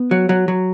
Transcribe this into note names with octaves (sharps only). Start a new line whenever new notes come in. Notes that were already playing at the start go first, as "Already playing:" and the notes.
Already playing: B3
F#3
F#3
F#3